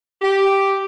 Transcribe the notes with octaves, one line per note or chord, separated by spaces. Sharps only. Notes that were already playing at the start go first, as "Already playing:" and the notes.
G4